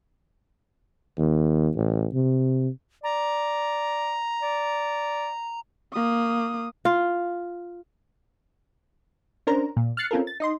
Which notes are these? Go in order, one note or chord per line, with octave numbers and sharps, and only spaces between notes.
D#2
A1
C3
D5 A#5
D5
A#3 D#6
F4
C#4 D4 A#4 C5 A#5
A#2
F6 F#6 A6 C7 C#7
C4 C#4 F4 A4 A#4
A6
D#4 D#5 C6